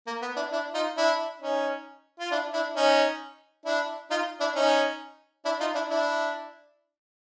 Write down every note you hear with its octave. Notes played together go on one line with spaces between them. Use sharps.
A#3
B3
D4 E4
D4 E4
D#4 F4
D4 E4
C#4 D#4
F4
D4 E4
D4 E4
C#4 D#4
D4 E4
D#4 F4
D4 E4
C#4 D#4
D4 E4
D#4 F4
D4 E4
D4 E4